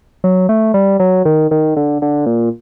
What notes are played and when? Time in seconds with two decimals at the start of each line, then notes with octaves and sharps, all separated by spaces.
0.24 F#3
0.49 A3
0.74 G3
1.00 F#3
1.25 D#3
1.51 D#3
1.77 D3
2.02 D3
2.26 A#2